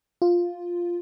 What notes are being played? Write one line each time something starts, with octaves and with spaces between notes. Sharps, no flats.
F4